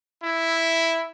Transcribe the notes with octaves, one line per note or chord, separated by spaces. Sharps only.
E4